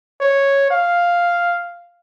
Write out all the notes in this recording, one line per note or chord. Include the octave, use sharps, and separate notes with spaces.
C#5
F5